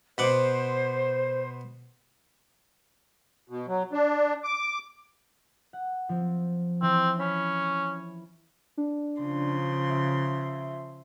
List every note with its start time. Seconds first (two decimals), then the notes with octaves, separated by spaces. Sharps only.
0.18 B2 C5 F#5 D6
3.50 B2
3.68 F#3
3.92 D4
4.44 D6
5.73 F#5
6.09 F3 C4
6.82 E3 C4
7.19 C#4 B5
8.77 D4
9.21 C#3 F3 C6
9.90 E5